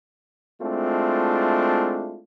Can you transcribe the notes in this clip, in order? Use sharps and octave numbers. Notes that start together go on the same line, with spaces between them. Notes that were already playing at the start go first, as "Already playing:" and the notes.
G#3 A3 C4 D4 E4 F4